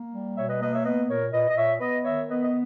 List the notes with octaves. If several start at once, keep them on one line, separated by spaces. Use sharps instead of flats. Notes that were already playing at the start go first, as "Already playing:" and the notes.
Already playing: A#3
G3
B2 C#5 E5
B4 D#5
A#3 B4 D#5
C#5 E5
B3 B4 D#5
A#2 A#4 C#5
A#2 B4 D#5
D#5
A#2 C#5 E5
B3 B4 D#5
D#3 C#5 E5
B3 B4 D#5
D#5